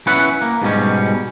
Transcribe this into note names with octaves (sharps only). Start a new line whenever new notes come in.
C#4 E4 B4 E5 F#5
A#3
G#2 B2 G3 C#4